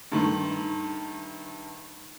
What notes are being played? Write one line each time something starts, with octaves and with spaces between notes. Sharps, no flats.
G2 D#3 A3 C6